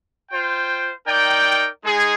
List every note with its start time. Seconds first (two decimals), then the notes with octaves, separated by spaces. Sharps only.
0.30 F4 C5 G5
1.06 D#4 A#4 D5 G5
1.83 G#3 D#4 G#4